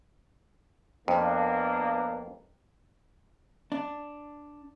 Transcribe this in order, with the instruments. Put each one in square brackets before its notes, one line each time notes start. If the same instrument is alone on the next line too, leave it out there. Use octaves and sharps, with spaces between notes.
[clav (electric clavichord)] F2 [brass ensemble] A#3 B3 D4
[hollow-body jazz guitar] D4